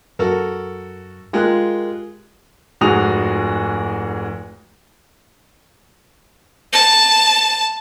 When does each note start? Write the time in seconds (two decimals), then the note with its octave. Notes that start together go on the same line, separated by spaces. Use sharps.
0.19 F#2 F#4 A4 A#4
1.33 G#3 F4 G4 A#4 F#6
2.81 F1 G#2 F#4 G#4 D#6 F7
6.73 A5